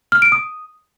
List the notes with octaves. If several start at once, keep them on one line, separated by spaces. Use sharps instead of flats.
F6
D7
D#6